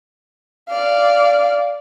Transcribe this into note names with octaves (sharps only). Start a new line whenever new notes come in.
D5 F5